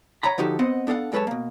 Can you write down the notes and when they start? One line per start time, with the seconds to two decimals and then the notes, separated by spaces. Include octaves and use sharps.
0.23 C#5 F#5 A#5 B5
0.38 D3 F3 D#4 F#4 G4 A4
0.59 B3 C4 C5 D#5 F#5
0.87 B3 D4 A4 F5 F#5
1.12 F#2 G#3 A4 B4 C#5 A5
1.27 B2 A#3